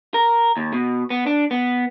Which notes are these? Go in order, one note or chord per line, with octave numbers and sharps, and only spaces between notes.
A#4
D#2
B2
B3
D4
B3